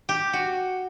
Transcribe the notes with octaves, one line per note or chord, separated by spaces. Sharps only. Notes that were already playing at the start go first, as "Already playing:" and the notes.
G4
F#4